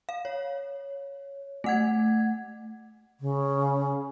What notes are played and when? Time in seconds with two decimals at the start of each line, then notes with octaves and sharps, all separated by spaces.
0.09 F5
0.25 C#5
1.64 A3 F#5 G#6
3.20 C#3